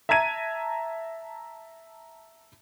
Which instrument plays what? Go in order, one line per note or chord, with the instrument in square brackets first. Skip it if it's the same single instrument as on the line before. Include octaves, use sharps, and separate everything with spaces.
[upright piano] E5 A5 A#5 G#6 D#7